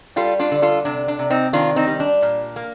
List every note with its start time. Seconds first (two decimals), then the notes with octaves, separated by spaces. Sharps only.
0.16 G3 F4 A4
0.39 D4 F4
0.51 D3
0.62 F4 A4
0.85 C3 D4
1.08 D4
1.19 C3
1.30 C4 D#4
1.53 D#3 D4 F4
1.76 C4 D#4
1.87 G3
2.00 D4
2.22 A#2
2.56 A#3